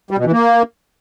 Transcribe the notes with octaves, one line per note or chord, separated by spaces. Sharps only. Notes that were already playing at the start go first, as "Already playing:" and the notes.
G3
B2
E3
A#3